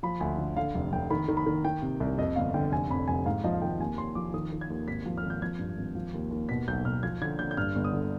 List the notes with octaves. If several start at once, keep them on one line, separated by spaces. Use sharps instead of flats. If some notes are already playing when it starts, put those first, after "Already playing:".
F3 B5
D2 G#5
D3
D3 F5
F1
F1 G5
D#3 B5
D#3
B5
D#3
D#3 G5
C3
C2
F2 D#5
G1 F5
D3 G5
F1 G#5
F2 B5
F1 G#5
G#2 F5
F3 D#5
F5
G#1 G5
D#2 G#5
D#2 C6
F3 D6
D#3 D#6
D#3
G#6
D#2
G#1 B6
F3
F6
G#1
G6
F3 G#6
G2
G#1
F3
D#2
D#2
B2 B6
B1 G6
B2 F6
F3 G#6
D3 G#6
D3 G6
G6
G2 F6
G1
D#6
D3